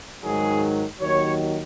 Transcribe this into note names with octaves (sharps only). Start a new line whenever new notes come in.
G#2 D#3 F#3 G#4
D#2 D#3 F#3 C#5